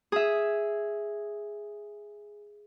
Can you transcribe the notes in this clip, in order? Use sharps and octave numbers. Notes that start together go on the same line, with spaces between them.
G#4 E5